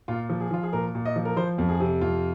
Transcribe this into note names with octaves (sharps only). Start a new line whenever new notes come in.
A#2 F4
F3
G#4
F3 F4
G#4
A#2 A#4
A#2
D#5
F3
A#4
F3 C5
F2
G#4
C3
F2 F4